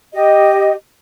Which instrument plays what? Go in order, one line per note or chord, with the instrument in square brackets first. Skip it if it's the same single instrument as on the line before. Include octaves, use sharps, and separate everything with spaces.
[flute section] G4 D#5